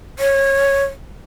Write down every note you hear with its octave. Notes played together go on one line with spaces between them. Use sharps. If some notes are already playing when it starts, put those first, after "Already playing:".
C#5